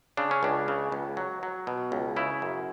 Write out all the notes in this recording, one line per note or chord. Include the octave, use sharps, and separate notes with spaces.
C#3 D4
C#4
C#2 D4
C#3
C#2
F#3
F#3
B2
C#2
C#3 E4
F#2